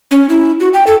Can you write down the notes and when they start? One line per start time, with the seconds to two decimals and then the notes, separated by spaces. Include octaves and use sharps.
0.11 C#4
0.29 E4
0.60 F#4
0.74 G5
0.87 A4